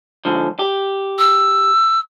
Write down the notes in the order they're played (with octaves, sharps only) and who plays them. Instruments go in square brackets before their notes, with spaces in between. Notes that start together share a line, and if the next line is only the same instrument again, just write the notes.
[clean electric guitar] G#2 D3 F3
G4
[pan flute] E6